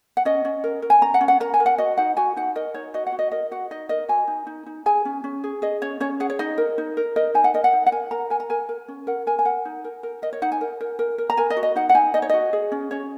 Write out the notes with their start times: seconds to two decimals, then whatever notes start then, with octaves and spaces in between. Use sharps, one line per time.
0.17 F#5
0.25 C#4 D#5
0.45 C#4
0.64 A#4
0.82 A#4
0.90 G#5
1.02 C#4 A#5
1.14 F#5
1.21 C#4
1.28 F#5
1.40 A#4 A#5
1.54 G#5
1.60 A#4
1.66 F#5
1.78 F#4 D#5
1.97 D#4 F#5
2.17 F#4 G#5
2.37 D#4 F#5
2.55 A#4 D#5
2.74 D#4 C#5
2.94 F#4 D#5
3.07 F#5
3.12 F#4
3.19 D#5
3.32 A#4 D#5
3.51 F#4 F#5
3.71 D#4 D#5
3.89 A#4 D#5
4.09 F#4 G#5
4.28 D#4
4.47 D#4
4.66 D#4
4.86 G#4 G#5
5.05 C#4
5.24 C#4
5.44 G#4
5.62 G#4 D#5
5.82 C#4 C#5
6.00 C#4 C#5
6.20 G#4 F#5
6.30 C#5
6.39 D#4 D#5
6.58 A#4
6.78 D#4
6.97 A#4
7.16 A#4 D#5
7.34 D#4 G#5
7.44 F#5
7.54 A#4 D#5
7.64 F#5
7.73 D#4
7.86 F#5
7.92 A#4 G#5
8.11 A#4 A#5
8.30 A#4 G#5
8.40 A#5
8.50 A#4 G#5
8.69 A#4
8.88 C#4
9.07 A#4 F#5
9.27 A#4 G#5
9.39 G#5
9.45 A#4 F#5
9.65 D#4
9.84 A#4
10.03 A#4
10.22 A#4 D#5
10.33 C#5
10.42 D#4 F#5
10.52 G#5
10.61 A#4
10.81 A#4
10.99 A#4
11.18 A#4
11.30 A#5
11.37 A#4 G#5
11.50 D#5
11.57 F#4
11.63 D#5
11.76 D#4 F#5
11.89 F#5
11.94 D#4 G#5
12.14 D#4 D#5
12.22 C#5
12.29 F#4 D#5
12.53 G#4
12.72 C#4
12.91 C#4 C#5